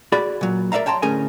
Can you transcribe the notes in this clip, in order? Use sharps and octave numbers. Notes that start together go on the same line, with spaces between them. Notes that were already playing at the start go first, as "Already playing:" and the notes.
F#4 G#4 D5 B5
A#2 F#3
A#4 D5 E5 F5 A#5
C#5 G5 A5 A#5 C6
D2 A2 C#4 G#4 A#4 G#5